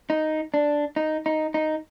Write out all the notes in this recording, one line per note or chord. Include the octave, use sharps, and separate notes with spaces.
D#4
D4
D#4
D#4
D#4